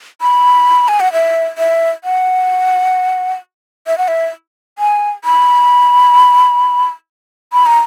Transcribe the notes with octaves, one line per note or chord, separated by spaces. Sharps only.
B5
G#5
F#5
E5
E5
F#5
E5
F#5
E5
G#5
B5
B5
A#5